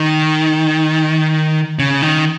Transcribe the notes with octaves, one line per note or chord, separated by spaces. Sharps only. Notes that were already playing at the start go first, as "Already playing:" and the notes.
Already playing: D#3
C#3
D#3